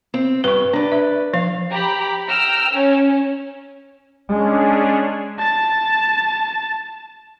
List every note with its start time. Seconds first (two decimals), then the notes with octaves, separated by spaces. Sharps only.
0.14 C4
0.44 G2 B4 C#6
0.73 D4 B4 D5
0.92 E5
1.33 F3 F5
1.72 G4 A#5 B5
2.27 G5 A#5 E6 F6
2.72 C#4
4.29 G#3 C#4 D4 G#4
5.38 A5 A6